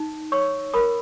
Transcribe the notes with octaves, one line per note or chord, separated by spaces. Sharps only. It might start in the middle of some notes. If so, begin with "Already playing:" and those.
Already playing: D#4
C#5 C#6 E6
A#4 B5 D#6